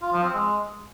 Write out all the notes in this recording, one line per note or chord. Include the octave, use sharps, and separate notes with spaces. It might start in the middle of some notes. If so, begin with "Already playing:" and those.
F4
F3
C4
G#3